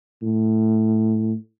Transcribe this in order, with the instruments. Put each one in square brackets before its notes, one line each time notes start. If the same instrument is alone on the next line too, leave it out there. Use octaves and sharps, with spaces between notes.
[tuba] A2